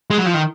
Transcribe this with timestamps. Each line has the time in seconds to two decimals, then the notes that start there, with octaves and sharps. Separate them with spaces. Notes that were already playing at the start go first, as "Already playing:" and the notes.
0.10 G#3
0.18 F#3
0.26 F3
0.34 D#3